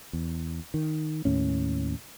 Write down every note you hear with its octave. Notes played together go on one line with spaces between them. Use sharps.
E2
D#3
D#2 A2 C#4